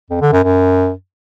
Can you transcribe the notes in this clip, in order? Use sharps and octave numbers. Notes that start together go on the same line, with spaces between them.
F2
D3
F#2
F#2